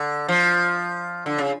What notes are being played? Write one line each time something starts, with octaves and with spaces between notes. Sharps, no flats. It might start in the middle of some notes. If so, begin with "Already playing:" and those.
Already playing: D3
F3
D3
C#3